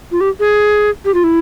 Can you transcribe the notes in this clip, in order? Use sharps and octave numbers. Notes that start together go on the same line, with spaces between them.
F4
G4
G#4
G4
F4
E4